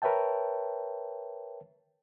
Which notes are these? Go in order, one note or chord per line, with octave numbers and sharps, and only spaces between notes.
A#4 B4 C#5 E5 G5 A5